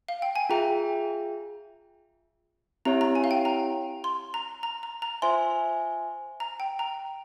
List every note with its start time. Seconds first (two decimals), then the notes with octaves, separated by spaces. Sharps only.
0.08 F5
0.22 G5
0.36 G#5
0.50 F4 G#4 E5 G5 A#5
2.85 C4 E4 G4 C#5 E5 A#5
3.01 A#5
3.15 G#5
3.24 F5
3.31 G5
3.45 A#5
4.04 C6
4.34 A#5
4.63 A#5
4.83 A#5
5.02 A#5
5.22 F4 C5 E5 G#5 C6
6.40 A#5
6.60 G5
6.79 A#5